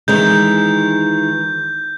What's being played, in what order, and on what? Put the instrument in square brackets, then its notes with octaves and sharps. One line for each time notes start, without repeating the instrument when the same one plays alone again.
[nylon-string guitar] D#3 E3 G#3 [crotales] G6